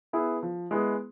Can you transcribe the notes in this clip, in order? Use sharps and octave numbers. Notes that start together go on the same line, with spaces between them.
B3 E4 G#4 B4
F3
G#3 B3 E4 G#4